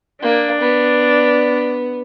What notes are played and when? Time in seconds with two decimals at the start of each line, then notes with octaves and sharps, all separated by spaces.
0.22 A#3 D4
0.60 B3